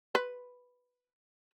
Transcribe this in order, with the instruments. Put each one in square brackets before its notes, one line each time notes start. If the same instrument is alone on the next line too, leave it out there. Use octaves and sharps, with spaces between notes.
[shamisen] B4